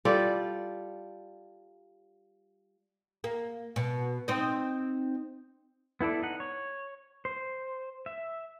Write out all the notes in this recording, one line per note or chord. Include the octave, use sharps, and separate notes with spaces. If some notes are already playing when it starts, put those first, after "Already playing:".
G3 F4 A4 D5
A#3
B2
C4 D#4 D#5
B3 E4 A4 D5
D#4 F#5
C#5
C5
E5